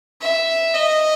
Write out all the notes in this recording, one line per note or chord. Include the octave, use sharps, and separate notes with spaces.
E5
D#5